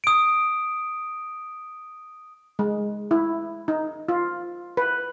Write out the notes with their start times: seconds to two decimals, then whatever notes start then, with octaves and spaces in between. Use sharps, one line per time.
0.04 D#6 D7
2.59 G#3
3.11 E4
3.68 D#4
4.09 F4
4.77 B4